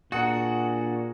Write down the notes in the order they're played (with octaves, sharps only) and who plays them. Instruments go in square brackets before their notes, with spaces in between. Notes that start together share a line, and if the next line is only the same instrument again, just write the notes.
[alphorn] A#2 [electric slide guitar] D4 F#4 [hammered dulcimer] G#4 A#4 [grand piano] F#5